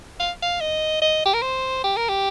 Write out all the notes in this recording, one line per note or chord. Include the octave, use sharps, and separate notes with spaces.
F5
F5
D#5
D#5
G4
A#4
C5
G4
A#4
G4